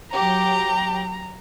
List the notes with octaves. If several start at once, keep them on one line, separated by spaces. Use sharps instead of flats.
F#3 G4 A#5